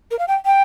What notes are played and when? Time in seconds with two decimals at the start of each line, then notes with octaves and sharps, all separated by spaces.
0.11 A#4
0.19 F5
0.28 G5
0.46 G5